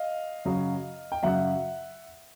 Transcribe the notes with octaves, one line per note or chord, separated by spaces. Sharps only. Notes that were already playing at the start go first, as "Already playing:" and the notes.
Already playing: D#5 F5
F#2 C#3 F#3
G5
F#2 C#3 F#3 E5 F#5